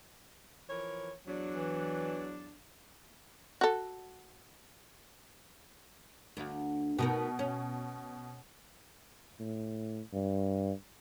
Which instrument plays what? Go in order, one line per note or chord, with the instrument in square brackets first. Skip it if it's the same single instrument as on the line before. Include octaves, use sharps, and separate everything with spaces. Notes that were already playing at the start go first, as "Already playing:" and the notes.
[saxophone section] E3 F3 A#4 [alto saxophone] C#5
[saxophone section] E2 D4 [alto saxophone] F#3
[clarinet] E3
[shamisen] F#4 A4
[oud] D2
[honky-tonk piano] B2 [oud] B3 D#4 A#4
[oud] C#4
[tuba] A2
G2